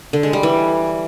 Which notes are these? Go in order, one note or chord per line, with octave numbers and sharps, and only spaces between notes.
D3
G#3
G3
E3